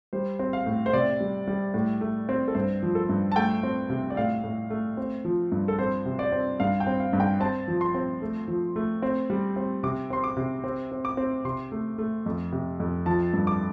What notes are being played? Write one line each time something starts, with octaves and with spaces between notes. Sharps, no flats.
G3 C5
C4
F5
A2
C5
C3 D5
G3
G3
A2
A3
C4
A4
G2 C5
F3
A4
G2
A5
A3 G5
C4
C3
D5
A2 F5
A2
A3
C4
F3
G2
A4
C4 C5
C3
D5
C4
G2 F5
G5
C4
F5
G2
G5
C4 A5
F3
C6
C4
A3
F3
A3
C4
G3
C4
C3 D6
C4 C6
D6
C3
C4
C4
D6
C4
C3 C6
A3
A3
F2
C3
F2
F3 A5
G2
D6